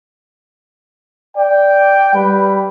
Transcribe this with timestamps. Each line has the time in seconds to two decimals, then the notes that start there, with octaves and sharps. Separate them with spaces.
1.37 D5 G5
2.15 G3 B4